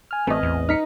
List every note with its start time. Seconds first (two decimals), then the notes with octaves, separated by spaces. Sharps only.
0.11 G#5 F6
0.27 A1 A3 C4 B4 D#5
0.43 E2
0.69 D#4 F6 B6 C#7